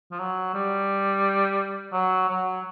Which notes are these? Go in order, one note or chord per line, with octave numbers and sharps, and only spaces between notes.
F3
F#3
G3
F#3
F#3